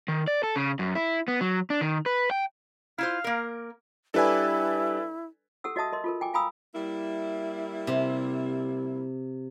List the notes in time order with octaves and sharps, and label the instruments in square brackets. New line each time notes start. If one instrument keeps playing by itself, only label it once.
[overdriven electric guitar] D#3
D5
A4
C#3
F#2
E4
B3
F#3
D4
D#3
B4
G5
[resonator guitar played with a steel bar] E4 F4 C5 [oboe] F5
[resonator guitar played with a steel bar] A#3 A#4
[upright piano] G3 D4 [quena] E4 [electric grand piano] A4 B4 G#5
[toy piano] G4 A4 F#5 E6
F#4 D#5 E5 A5 D#6
A#4 D#5 C6
F4 A4 A#4
G5 G#5 D6
F5 G#5 A#5 B5 D#6 E6
[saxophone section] G3 A#3 E4
[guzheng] C3